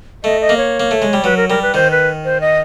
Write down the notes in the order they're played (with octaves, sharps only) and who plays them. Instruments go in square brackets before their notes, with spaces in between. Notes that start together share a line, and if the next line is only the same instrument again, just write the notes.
[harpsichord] A3 [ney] D#5
[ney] D#5
[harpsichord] A#3
[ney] C#5
[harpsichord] A#3
A3
G#3
G3
[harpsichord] F#3 [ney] B4
[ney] A#4
[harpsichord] G3 [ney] A#4
[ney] B4
[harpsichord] D#3 [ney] C5
[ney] B4
C5
D#5